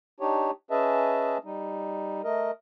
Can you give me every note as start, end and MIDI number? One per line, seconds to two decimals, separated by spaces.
0.20 0.51 62
0.20 0.51 63
0.20 0.51 67
0.20 0.51 73
0.71 1.38 61
0.71 1.38 68
0.71 1.38 71
0.71 1.38 75
0.71 1.38 76
0.71 1.38 81
1.45 2.22 55
1.45 2.22 63
2.24 2.51 57
2.24 2.51 70
2.24 2.51 75